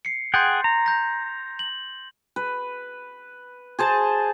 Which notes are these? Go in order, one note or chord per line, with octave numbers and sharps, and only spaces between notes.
C7 C#7
G#4 F#5 G5 C6 G6 A6
A#5
G6 A#6
F#7
B4
G#4 C5 A5